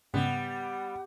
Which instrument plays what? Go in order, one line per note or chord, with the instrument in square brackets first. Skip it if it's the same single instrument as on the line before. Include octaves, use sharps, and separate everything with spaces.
[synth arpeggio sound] G#2 C#3 [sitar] G3 [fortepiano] B3 [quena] F#5